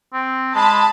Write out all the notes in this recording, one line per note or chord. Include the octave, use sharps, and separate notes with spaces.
C4
G#3 A5 B5